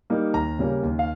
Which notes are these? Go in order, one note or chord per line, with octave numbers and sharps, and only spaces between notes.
G3 A#3 D#4
D#2 A#5
C#3 G3 A#3 C#4
D#2
F5